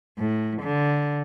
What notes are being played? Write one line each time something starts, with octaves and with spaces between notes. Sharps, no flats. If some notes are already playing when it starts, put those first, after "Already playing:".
A2
D3